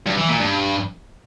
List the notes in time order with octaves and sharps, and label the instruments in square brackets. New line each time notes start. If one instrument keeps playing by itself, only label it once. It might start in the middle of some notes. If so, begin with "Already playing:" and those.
[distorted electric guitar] G2
E3
A#2
G2